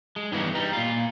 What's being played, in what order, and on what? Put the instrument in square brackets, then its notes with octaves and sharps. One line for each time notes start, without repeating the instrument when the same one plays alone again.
[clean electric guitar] G#3
G2 D#3 E3 B3 D#4
G3 D#4
A#2 F4